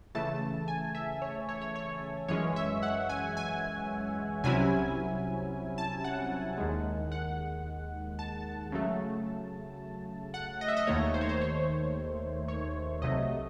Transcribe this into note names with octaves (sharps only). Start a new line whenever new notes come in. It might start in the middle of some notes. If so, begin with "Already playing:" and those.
C#3 E3 A3 A5
G#5
E5
C#5
C#5
C#5
C#5
F#2 E3 G#3 C#4 C#5
E5
F#5
G#5
G#5
C2 C3 F#3 C#4 E4 G#5
A5
F#5
D#2 D#3 G#3
F#5
A5
C#3 F#3 A3
F#5
D#5
E5
D#5
D#2 D#3 A3 C#5
C5
C#5
C5
C#5
C#5
C2 C3 F#3 A3 D#5